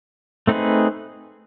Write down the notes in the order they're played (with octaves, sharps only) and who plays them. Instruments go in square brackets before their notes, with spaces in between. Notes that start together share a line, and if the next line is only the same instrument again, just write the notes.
[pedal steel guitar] A3 C4 D#4 G#4 B4